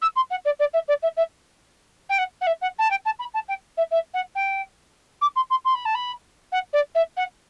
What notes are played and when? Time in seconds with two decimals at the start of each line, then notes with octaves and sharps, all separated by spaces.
0.02 E6
0.16 C6
0.30 F#5
0.45 D5
0.59 D5
0.73 E5
0.88 D5
1.02 E5
1.17 E5
2.09 G5
2.18 F#5
2.41 F#5
2.47 E5
2.61 F#5
2.78 A5
2.90 G5
3.05 A5
3.19 B5
3.34 A5
3.48 G5
3.77 E5
3.91 E5
4.14 F#5
4.35 G5
5.21 D6
5.36 C6
5.50 C6
5.65 C6
5.74 B5
5.85 A5
5.95 B5
6.52 F#5
6.73 D5
6.95 E5
7.17 F#5